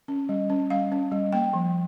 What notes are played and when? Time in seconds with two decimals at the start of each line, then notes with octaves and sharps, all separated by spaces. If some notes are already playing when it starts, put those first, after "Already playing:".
0.08 C#4
0.29 G3
0.50 C#4
0.70 G3 F5
0.92 C#4
1.12 G3
1.33 A#3 G5
1.53 F3